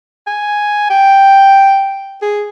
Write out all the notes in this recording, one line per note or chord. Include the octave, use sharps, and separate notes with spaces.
G#5
G5
G#4